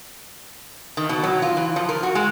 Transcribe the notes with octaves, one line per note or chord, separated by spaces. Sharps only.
D#3
B2
F#3
F4
E3
F3
A#4
F#4
G#3